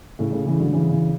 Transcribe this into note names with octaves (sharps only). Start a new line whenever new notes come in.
A2 C#3
A2 C#3
C#3 E3
D3 F#3
C#3 E3
C#3 E3